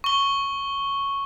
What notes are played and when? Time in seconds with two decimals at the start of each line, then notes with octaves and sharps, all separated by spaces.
0.04 C#6 G7